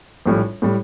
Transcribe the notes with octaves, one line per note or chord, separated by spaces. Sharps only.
A#1 A2 G3
A2 G3